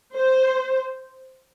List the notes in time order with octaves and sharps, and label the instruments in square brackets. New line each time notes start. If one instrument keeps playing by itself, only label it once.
[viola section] C5